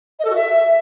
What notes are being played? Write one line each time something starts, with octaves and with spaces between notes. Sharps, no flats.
D#5
A4
F#4
E5